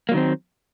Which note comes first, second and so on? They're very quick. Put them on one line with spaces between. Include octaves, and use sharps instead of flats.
A#3 F#3 D#3 C4